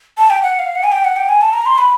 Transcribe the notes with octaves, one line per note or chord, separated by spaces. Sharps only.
A5
G5
F#5
F5
F#5
G#5
G5
F#5
G5
G#5
A5
A#5
C6
B5